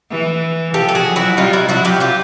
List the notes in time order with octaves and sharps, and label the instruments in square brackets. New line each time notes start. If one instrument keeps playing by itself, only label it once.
[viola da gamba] E3
[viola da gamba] F3 [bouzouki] G4 A4
[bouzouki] A4
F#4 G#4
[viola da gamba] F#3
[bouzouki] E4 F#4
[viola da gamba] G3 [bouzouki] D#4 F4
[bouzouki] E4 F#4
[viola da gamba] F#3 [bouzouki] E4 F#4
[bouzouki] F4 G4
F4 G4